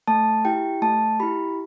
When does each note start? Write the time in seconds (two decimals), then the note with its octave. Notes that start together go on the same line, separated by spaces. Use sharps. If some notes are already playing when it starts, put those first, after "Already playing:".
0.08 A3 A5
0.45 E4 G4 G5
0.82 A3 A5
1.20 E4 G4 B5